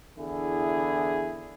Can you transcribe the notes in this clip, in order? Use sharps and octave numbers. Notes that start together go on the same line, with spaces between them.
E2 D3 E4 G#4